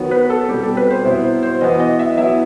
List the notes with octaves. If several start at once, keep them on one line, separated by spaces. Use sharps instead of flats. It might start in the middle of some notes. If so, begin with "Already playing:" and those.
Already playing: D#3 F#3 B3 F#4
B4
A4
B2 G3 C4 G4
A4
B4
C5
B2 F#3 B3 E4 C5
C5
C5
E3 B3 F#4 D#5
D#5
E5
F#3 B3 E4 E5